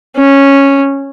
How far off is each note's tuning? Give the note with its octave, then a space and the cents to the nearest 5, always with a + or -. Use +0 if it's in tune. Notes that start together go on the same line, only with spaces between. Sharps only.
C#4 -5